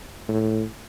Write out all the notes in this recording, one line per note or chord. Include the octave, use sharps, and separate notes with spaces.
A2